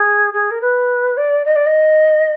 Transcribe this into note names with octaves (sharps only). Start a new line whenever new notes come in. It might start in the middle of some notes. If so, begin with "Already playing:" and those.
Already playing: G#4
G#4
A#4
B4
D5
D#5
D5
D#5